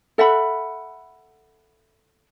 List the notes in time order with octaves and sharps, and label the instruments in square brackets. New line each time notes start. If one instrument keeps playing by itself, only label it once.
[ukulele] A4 E5 F#5 B5